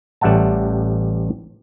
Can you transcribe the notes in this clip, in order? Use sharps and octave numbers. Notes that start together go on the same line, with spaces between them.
A1 G3 E5 F#5 A5